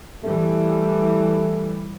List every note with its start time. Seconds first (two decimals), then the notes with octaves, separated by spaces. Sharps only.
0.24 E3 G3 A3